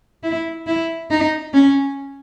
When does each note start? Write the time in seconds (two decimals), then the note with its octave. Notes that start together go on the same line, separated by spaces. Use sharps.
0.23 E4
0.67 E4
1.11 D#4
1.54 C#4